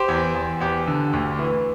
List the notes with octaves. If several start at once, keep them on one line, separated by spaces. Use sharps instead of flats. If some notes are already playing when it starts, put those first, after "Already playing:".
Already playing: G4 C5
E2
E2
E2 G4
D3
D2
E3